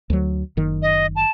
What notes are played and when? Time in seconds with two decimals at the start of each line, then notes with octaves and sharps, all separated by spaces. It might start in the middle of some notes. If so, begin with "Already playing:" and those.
0.10 D2 F#3
0.57 F#1 D#3
0.82 D#5
1.16 A5